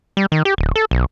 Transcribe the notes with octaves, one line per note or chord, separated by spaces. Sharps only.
G3
D#3
G4
D1
A4
B1